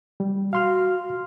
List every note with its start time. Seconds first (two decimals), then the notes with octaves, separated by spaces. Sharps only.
0.20 G3
0.53 F#4 F5 C6 F6